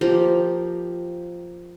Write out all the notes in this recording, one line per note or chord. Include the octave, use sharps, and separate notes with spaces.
F3 A#3 G4 A#5